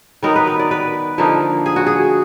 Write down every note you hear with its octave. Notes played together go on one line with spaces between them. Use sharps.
D#3 F#3 B3 D#4 A#4
B4
B4
D5
B4
D3 F3 A#3 D#4
G#4
F#4
G#4